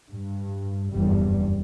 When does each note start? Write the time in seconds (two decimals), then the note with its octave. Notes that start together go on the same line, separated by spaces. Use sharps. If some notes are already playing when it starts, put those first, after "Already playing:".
0.10 G2
0.91 F#1 E2 G2 G3